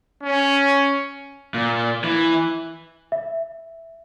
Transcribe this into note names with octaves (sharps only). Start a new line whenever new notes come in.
C#4
A#2
E3
E5